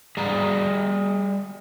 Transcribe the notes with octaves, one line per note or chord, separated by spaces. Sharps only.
G3 G#4 A#5